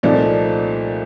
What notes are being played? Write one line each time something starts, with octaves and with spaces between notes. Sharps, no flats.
C2 A#2 F3 A3 D#4 D5